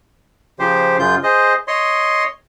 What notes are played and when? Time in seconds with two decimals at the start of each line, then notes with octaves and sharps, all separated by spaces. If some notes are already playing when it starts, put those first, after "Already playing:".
0.59 C#3 F3 G4 C5
0.99 F#2 C#3 F4 G6
1.23 G#4 C5 D#5
1.68 C#5 D#5 C6